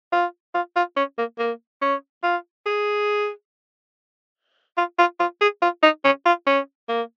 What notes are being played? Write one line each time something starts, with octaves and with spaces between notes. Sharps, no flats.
F4
F4
F4
C#4
A#3
A#3
C#4
F4
G#4
F4
F4
F4
G#4
F4
D#4
C#4
F4
C#4
A#3